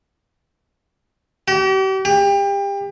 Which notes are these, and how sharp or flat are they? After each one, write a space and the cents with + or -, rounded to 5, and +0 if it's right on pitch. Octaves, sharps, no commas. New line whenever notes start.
G4 -40
G4 +30